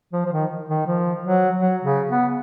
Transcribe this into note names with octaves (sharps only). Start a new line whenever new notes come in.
F3
F3
D#3
D#3
F3
F#3
F#3
C#3
B3